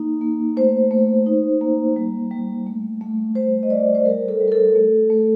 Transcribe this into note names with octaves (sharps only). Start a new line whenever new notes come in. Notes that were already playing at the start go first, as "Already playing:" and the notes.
Already playing: A#3 D#4
A#3
A3 C5
A3
D#4
A#3
G3
G3
A3
A3
G3 C5
D#5
G3 D5
C5
G3 A#4
A4
G3
A#4
A4
A3
A3